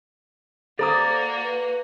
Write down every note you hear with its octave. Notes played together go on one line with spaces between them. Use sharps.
A#3 F#4 A4 C5 D5 A#5 D#6
B4